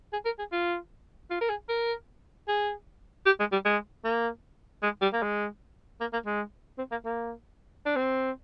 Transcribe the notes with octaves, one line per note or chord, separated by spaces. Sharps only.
G#4
A#4
G#4
F4
F4
A#4
G#4
A#4
G#4
G4
G#3
G3
G#3
A#3
G#3
G3
A#3
G#3
A#3
A#3
G#3
C4
A#3
A#3
D4
C4